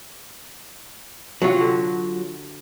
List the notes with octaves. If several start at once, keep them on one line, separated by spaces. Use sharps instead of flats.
C3 F#3 F4 F#4
D3